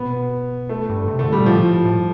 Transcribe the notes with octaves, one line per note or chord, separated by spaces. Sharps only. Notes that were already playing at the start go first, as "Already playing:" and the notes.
Already playing: B2 B3
A3
G2
C3
D3 A3
B2 G3
A2 F3
A2